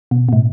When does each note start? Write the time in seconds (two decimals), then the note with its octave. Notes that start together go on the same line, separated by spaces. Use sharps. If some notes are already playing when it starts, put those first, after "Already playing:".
0.11 B2
0.28 B2
0.33 A2